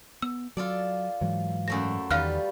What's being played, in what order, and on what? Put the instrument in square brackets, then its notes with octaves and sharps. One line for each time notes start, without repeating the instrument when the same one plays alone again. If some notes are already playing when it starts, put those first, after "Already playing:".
[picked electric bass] B3 [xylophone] E6
[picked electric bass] F#3 [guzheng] F4 A4 D5
[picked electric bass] G#2 E3 F#3
[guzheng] F#2 A3 C5 [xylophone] A#6
[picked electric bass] E2 D#3 [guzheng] G3 F4 B4 [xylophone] F5 F6 F#6